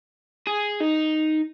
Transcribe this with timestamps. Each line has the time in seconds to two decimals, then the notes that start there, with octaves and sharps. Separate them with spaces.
0.47 G#4
0.80 D#4